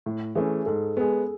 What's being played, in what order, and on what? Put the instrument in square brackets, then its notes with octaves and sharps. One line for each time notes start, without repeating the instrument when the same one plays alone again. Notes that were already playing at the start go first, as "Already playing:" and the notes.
[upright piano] A2
[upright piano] E3 A3 C#4 [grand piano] G#4
[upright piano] G#2 [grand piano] A4
[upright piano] G#3 B3 [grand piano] G#4